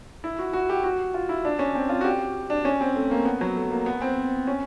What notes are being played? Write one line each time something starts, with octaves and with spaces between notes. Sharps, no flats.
E4
F#4
F#4
G4
F#4
F4
E4
D4
C#4
C4
F4
F#4
G4
D4
C#4
C4
A3
A#3
B3
F#3
A3
A#3
B3
C4
C#4